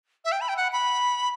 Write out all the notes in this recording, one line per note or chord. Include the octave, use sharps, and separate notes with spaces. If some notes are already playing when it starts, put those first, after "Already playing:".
E5
G5
B5
G5
F#5
B5